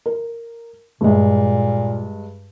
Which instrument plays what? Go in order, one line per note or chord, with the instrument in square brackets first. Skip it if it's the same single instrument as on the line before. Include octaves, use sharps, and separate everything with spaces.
[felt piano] A#4
[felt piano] G2 G#3 [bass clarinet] A#2